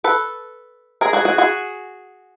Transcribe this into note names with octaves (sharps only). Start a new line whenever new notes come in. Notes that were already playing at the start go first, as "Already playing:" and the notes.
A4 B4
G#4 A#4
F#4 G#4
F#4 G#4
F#4 G#4